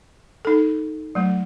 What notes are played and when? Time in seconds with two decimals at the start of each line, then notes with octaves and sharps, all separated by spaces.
0.45 D#4 A4
1.15 F#3 A3